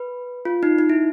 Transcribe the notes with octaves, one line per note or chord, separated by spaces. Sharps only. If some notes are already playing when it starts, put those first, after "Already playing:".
Already playing: B4
F4
D#4
D#4
E4